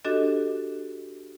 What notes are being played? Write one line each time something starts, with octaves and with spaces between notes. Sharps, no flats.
D4 F#4 G4 A4 D#5